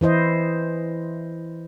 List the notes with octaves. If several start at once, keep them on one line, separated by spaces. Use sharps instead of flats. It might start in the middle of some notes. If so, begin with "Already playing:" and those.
E3 E4 C5 D#5